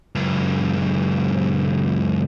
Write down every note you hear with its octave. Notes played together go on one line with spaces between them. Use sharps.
C#2 F#2